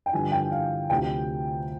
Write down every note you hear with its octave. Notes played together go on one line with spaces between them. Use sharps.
G5
G2 D3 F3 G#5
G5
F5
D2 C3 F3 G5